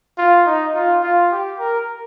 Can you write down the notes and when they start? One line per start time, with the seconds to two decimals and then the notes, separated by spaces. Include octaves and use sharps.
0.18 F4
0.46 D#4
0.75 F4
1.03 F4
1.31 G4
1.59 A#4